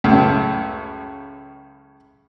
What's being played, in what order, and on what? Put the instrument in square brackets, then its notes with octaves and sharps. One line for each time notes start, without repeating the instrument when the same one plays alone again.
[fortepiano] C#2 F#2 A2